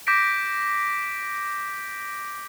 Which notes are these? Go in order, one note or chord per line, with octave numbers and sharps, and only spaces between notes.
D6 G6 A#6 B6 D7